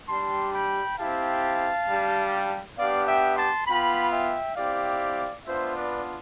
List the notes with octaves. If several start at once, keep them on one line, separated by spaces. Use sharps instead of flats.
G3 D4 G4 A5 C6
G5 B5
C4 E4 G4 F5 A5
G3 D4 G4
B3 D4 G4 D5 F5
E5 G5
A5 C6
B3 F4 G5 B5
E5 G5
C4 E4 G4 D5 F5
B3 D4 F4 C5 E5
B4 D5